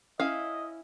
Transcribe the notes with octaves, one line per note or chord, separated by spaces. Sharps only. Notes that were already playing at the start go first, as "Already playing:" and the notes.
C#4 E4 D#5 F5